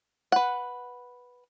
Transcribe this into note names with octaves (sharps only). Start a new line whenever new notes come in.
B4 F#5